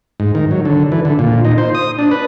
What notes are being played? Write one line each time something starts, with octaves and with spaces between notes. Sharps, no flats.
G#2
D#3
F#3
D3
E3
D3
A#2
D#4
C5
D#6
D4
B4